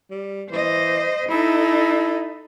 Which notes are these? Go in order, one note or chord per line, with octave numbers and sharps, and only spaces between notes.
G3
E3 C5 D#5
D#4 E4 A4